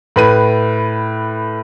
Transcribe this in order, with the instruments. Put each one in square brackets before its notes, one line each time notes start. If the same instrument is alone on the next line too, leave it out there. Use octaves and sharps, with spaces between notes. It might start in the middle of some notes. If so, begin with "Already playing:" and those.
[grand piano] A2 B4 D#7